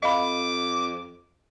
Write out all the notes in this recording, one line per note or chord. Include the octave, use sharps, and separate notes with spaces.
F2 D#5 F5 B5 D6